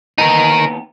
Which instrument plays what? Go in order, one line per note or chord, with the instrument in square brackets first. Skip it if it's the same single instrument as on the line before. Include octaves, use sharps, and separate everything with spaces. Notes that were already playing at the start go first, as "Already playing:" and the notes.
[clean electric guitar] D#2 B3 A#5 [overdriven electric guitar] D#4 A#4